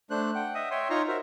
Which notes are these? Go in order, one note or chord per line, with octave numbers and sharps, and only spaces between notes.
A3 D4 C5 F#6
F#5 G5
D#5 E5 D#6
C#5 E5 G5 C6
D#4 F4 C#5 A#5 C6 C#6
F#4 A#4 C5 E5